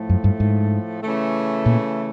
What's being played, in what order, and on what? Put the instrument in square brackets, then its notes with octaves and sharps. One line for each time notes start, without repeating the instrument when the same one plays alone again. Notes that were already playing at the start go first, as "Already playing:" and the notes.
Already playing: [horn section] A2 F3 A3
[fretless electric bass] F#2
G2
G#2
[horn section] C#3 E3 A3
[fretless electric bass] A#2